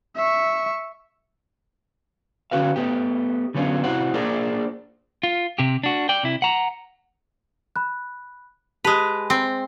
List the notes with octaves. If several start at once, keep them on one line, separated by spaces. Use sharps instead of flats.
E5 C#6
D3 C#4 F#4 B4 F5
A3 B3 G4
D3 F#3 B3 C#4 F4
C3 E4 F#4 C5 F#5
A#3 D4 F4 G#4 A#4 C5
F4
C3 G4
D4 F#4
D5 G5
C3 E4
F#5 A#5
B5 F#6
G#3 G4 B4 A5 F7
C4